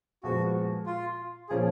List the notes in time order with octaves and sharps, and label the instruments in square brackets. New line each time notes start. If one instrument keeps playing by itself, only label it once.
[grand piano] A#2 F3 G#3 B3 [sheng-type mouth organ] F#4
[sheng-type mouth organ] F4
[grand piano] A#2 F3 A#3 C#4 [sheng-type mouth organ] G#4